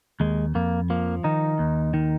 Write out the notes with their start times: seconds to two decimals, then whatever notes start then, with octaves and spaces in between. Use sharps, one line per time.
0.20 D#2 G#3
0.55 F2 A#3
0.90 F3 A#3
1.24 D#3 D#4
1.59 D#2
1.94 D#3